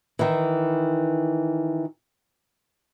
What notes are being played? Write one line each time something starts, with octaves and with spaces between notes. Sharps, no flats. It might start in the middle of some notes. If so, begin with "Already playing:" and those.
D#3 E3